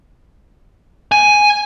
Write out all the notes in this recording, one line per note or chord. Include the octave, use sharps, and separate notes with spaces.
G#5